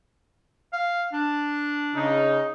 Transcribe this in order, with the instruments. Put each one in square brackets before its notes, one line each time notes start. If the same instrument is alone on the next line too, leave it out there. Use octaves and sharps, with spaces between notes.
[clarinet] F5
D4
[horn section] C#3 D#4